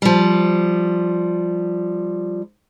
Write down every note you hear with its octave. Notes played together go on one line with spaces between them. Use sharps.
F3 G3